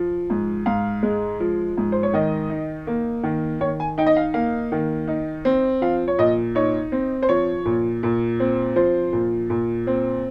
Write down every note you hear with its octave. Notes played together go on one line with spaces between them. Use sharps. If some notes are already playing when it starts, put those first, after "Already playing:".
Already playing: F3
G#2
G#2 F5
G#3
F3
G#2
C5
C#5
D#3 D#5
D#4
A#3
D#3
D#3 C#5
G#5
D#4 G5
D#5
F5
A#3 F5
D#3
D#4
C4
F3 F5
C#5
A#2 D#5
D#4 C#5
C4
C5
F3 C#5
A#2
A#2
C4
F3 C5
A#2
A#2
C4